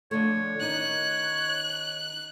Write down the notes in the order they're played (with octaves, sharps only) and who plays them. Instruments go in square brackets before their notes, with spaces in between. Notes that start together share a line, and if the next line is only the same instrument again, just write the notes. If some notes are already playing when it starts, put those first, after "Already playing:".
[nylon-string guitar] D3 F3 A3 [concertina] C#5
[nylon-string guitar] D#3 C#4 D#4 [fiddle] F#6